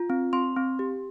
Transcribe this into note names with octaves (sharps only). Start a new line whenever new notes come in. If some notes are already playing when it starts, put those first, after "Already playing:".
Already playing: F4
C4
C4 C6
C4
G4